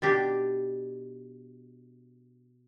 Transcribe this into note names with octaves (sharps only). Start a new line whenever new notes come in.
B2 D4 G4